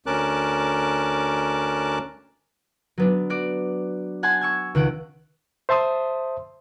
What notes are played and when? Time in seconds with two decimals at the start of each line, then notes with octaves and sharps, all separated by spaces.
0.06 D2 C#4 A#4 A5 D6 F#6
2.98 F#3 B3 D4
3.30 F#4 D5
4.23 F#5 G#5 A5 C6 G#6
4.41 C#6 E6 G#6
4.75 C#2 D#3 F#5 D7
5.69 C5 E5 A5 C6 D#6